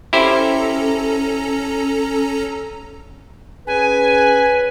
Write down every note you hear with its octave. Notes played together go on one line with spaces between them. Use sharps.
C#4 E4 G4 A4 C5 A#5
C#4 G#4 B4 G#5